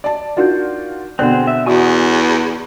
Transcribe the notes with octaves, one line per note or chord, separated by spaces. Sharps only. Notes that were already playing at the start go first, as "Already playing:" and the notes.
D5 A5
D4 D#4 F4 F#4 A#4 G6
B2 D3 C4 G#4 C5 D5 F#5 F#6
E5
E2 F#4 D5 F#5 G#5 C#6 D#6